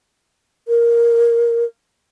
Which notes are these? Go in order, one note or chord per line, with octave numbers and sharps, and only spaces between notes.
A#4